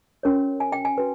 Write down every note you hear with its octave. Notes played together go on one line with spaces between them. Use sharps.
C#4 F#4 A#4 C#5
G#5
G5
G#5
F#4 B4